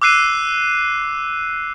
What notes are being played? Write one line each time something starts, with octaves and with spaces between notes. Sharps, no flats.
D6 E6 F#6 C7 D#7